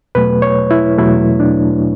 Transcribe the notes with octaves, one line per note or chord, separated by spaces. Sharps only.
E2 B2 F#3 A3 B4
C#5
E4
E2 B2 F#3 A3 E4
D4